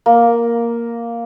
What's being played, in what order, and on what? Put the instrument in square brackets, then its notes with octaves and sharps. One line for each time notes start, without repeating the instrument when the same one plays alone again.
[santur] A#3